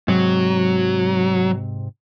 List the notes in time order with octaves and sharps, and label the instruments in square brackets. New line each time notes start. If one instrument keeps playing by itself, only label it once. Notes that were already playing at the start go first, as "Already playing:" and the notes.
[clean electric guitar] G#2 C3 [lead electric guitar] F#3